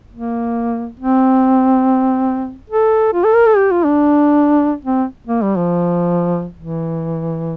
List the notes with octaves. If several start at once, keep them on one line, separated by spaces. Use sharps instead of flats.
A#3
C4
A4
F4
A4
A#4
A4
G4
F4
D4
C4
A#3
G3
F3
E3